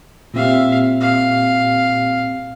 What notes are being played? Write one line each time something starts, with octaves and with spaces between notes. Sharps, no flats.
A#2 C4 G4 E5 F5
F5